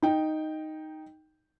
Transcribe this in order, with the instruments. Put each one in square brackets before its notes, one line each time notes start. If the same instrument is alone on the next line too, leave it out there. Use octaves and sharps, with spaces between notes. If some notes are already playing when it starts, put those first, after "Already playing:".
[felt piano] D#4 G5